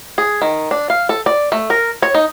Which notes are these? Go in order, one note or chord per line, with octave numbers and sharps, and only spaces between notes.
G#4
D#3
D4
F5
A4
D5
A3
A#4
C#5
D#4